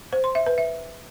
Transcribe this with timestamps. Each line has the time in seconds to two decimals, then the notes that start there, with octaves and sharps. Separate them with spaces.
0.13 C5
0.24 C6
0.35 E5
0.46 B4
0.58 E5